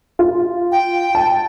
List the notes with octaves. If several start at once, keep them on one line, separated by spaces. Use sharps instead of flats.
F4
G5
A5